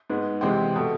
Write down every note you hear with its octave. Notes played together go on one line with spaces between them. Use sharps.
G#2 G#3 B3
E2 C3 G#3 C4
B2 A3